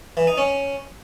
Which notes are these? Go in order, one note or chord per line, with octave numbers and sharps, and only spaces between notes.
E3
D#4
C#4